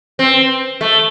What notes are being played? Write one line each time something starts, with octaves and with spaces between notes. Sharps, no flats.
C4
A3